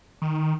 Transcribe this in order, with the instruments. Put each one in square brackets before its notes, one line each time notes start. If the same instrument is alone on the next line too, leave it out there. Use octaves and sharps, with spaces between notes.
[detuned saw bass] D#3